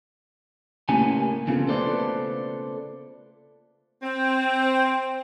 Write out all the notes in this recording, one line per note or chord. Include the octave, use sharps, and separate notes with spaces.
A2 C#3 A#3 C#4 G#5
E2 C#3 B3 F4 A4
A3 A4 B4 C5 D5
C4